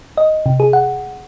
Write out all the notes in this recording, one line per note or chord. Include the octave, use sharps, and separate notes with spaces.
D#5
C3
G#4
F#5